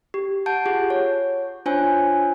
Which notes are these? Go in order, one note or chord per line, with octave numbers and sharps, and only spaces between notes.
G4
F#5 A5 G6 D7
F4 G4 G#4 F#5
C#5
D4 F4 C5 C#5 G#5